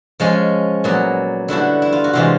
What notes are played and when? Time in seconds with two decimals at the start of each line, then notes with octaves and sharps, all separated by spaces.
0.20 F3 G#3 C#4
0.84 A#2 F#3 B3
1.48 D3 G3 B3 D4 E4 F#4
1.82 E4
1.93 F4
2.04 F#4
2.13 C3 E3 G#3 F4 G4